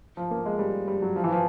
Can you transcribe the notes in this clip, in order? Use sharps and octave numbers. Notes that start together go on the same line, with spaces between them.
F3
A#3
G#3
G3
G3
F#3
F3
E3
F3